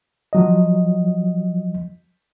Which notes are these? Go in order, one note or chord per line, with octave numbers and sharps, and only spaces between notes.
F3 F#3 D#5